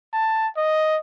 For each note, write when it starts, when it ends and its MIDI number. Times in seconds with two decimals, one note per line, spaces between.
0.13 0.48 81
0.57 0.98 75